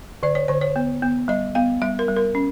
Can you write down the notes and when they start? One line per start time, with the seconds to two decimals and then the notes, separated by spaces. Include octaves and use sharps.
0.23 D3 D5
0.35 C#5
0.48 D3 C5
0.61 C#5
0.76 B3
1.02 B3
1.28 G3 D#5
1.55 B3 F5
1.82 G3 E5
1.99 A#4
2.08 G3
2.17 A#4
2.35 C#4